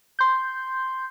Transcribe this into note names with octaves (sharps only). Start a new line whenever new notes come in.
C6 G6